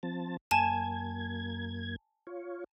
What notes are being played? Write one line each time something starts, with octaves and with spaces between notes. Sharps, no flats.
F3 C4 A5
F#2 A#3 G#5 A5 G#6 E7
F4 C#5